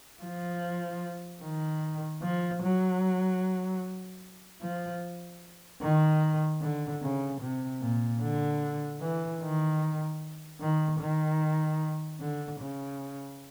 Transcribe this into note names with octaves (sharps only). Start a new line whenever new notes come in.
F3
D#3
F3
F#3
F3
D#3
D3
C#3
C3
A#2
D3
E3
D#3
D#3
D#3
D3
C#3